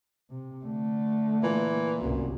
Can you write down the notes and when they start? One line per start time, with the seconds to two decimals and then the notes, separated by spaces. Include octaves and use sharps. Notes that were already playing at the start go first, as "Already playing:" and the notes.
0.30 C3
0.65 D3 A3
1.43 A#2 E3
2.01 G1 C2 F#2